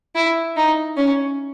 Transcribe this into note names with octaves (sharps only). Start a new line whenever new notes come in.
E4
D#4
C#4